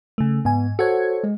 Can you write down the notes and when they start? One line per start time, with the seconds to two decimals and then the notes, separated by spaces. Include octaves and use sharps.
0.18 C#3 A3
0.45 G#2 B3 G#5
0.79 F#4 A4 C5 C#5 F#5 G#6
1.24 G#3